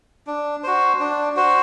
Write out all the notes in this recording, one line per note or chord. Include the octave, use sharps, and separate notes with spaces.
D4
F#4 C5
D4
F#4 C5